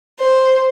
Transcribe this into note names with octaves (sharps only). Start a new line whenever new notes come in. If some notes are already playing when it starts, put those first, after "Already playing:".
C5